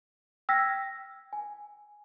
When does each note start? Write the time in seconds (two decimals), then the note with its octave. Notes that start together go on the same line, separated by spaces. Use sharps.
0.49 G5 E6 F6 G#6 A#6 B6
1.33 G#5